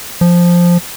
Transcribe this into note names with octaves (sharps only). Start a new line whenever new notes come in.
F3